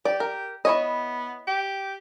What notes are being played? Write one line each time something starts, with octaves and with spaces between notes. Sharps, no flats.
G4 D5
A#4
B3 E4 C#5 D#5
G4